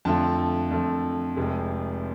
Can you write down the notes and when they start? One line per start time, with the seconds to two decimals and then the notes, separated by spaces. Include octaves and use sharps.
0.05 F2 D3 F3 A3 A5
0.71 F2 D3 F3 A3
1.37 F1 F2 C3 G#3